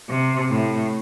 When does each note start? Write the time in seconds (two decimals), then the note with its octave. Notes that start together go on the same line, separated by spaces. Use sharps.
0.09 C3
0.51 A2